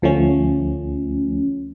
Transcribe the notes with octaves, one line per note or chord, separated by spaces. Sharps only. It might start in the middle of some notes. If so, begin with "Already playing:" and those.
D2 F3 A3 C#4